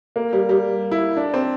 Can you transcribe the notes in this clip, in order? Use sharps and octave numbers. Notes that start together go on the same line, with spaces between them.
A#3
G3
G3
E4
D4
C4